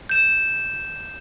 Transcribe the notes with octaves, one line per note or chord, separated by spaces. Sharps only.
G6 E7